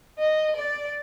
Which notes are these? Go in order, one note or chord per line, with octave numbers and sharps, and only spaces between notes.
D#5
D5